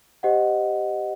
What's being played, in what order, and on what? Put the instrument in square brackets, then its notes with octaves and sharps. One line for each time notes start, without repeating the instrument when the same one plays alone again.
[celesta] G4 C5 D#5 F#5